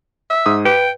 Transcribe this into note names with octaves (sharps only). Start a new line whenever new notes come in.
E5
G#2 D#6
B4 G5